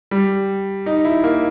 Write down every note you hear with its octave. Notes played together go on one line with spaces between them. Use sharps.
G3
D#4
E4
A#3